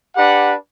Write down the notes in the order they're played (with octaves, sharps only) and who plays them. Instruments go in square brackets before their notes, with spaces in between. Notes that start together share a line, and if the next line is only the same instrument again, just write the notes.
[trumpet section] D4 G4 B4 F#5